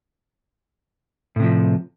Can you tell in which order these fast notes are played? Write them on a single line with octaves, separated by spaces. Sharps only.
A2 C3 F3